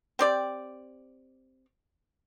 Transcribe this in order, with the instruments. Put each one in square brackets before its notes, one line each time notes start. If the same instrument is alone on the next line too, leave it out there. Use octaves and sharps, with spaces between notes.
[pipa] C4 G4 D5